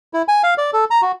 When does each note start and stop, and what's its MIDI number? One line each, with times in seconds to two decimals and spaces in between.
0.13 0.22 64
0.28 0.42 80
0.43 0.54 77
0.58 0.71 74
0.73 0.85 69
0.90 1.01 82
1.02 1.12 66